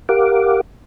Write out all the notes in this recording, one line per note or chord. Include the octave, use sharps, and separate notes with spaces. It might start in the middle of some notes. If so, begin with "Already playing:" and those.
G4 A#4 F5 F#5 D6